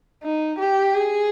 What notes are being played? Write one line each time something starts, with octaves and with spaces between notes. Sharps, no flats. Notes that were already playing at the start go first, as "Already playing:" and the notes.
D#4
G4
G#4